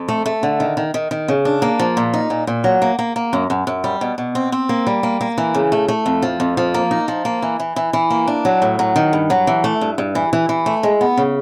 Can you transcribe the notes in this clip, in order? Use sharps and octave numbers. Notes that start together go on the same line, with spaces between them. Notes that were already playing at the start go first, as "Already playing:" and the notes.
Already playing: F2
A3
A3
D3
D#3
D#3
D#3
D#3
C#3
D4
A#3
F3
A#2
D#4
A#2
A#2
F#3
A#3
A#3
A#3
F#2
F#2
F#2
G3
B2
B2
C4
C4
A#3
G3
A#3
A#3
E3
C#3
A3
A3
F2
F3
F2
F3
A#3
D#4
F3
A#3
E3
E3
E3
E3
A#3
D4
F#3
A2
F#3
D#3
G2
F#3
E3
A3
G2
G2
E3
E3
E3
A3
G#3
B3
C#3